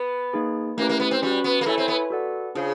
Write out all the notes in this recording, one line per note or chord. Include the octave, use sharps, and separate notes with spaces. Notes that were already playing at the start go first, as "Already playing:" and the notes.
Already playing: B3
A#3 D#4 G#4
A3 A#3 C#4 E4 G4 B4
A#3
B3
C4
G3 C#4 F#4 B4
B3
A#3
A3 E4 A4 C#5 E5 G#5
C4
B3
F#4 A4 D5 F#5
C#3 D4 F4 G#4 C5 F5